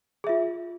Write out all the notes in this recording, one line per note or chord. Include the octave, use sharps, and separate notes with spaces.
F4 G#4 E5